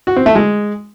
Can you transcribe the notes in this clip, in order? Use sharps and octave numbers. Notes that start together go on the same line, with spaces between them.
F#4
C4
A3
G#3